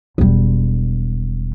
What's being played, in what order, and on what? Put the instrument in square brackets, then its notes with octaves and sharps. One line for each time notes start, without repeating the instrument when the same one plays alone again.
[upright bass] E1 G3